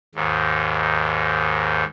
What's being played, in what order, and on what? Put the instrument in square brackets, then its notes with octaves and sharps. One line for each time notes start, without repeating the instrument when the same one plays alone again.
[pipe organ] D#2 G#2